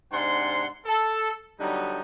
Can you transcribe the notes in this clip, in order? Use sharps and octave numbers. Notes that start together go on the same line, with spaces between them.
G#2 C3 D4 F#5 C6
A4
D3 F#3 G3 B3 D#4